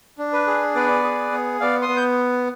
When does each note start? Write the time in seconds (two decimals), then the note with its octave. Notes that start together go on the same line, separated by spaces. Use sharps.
0.18 D4
0.33 B4
0.47 G#4
0.75 B3 B4 D5
1.03 G#4
1.32 B3
1.60 B3 D5 F5
1.82 C6 D#6
1.89 B3
1.97 G6